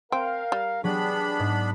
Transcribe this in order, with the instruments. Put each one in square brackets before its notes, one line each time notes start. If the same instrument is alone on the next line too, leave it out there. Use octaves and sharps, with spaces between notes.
[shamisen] C4 [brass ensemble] A#4 F5 [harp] G5
[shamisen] G3
[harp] F#3 [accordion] B3 D4 B5 [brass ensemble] G4 G#4
[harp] G#2